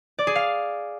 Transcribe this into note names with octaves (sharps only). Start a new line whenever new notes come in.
D5
G#4
F5